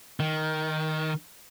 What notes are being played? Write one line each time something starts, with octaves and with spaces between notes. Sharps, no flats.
D#3